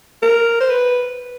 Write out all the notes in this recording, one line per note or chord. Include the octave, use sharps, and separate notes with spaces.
A#4
C5
B4